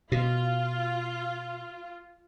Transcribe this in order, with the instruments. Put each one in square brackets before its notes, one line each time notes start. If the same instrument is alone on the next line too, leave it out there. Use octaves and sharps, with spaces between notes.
[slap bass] B2 [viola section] F4